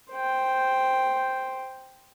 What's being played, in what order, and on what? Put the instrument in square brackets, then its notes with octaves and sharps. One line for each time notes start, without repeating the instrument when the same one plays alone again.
[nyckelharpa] C5 G5